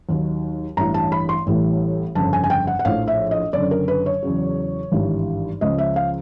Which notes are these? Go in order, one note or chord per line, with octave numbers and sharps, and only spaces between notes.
D#2 D#3 F#3
A1 G2 E3 A#5
A5
B5
C6
A1 A2 E3 G3
G1 F2 C#3 A5
G#5
G#5
G5
F#5
F#5
A#1 A2 F3 F5
E5
D#5
F#1 F#2 D3 D5
A#4
B4
C#5
E2 C#3 F#3
G#1 G2 E3 G3
C#2 C#3 F3 D#5
E5
F5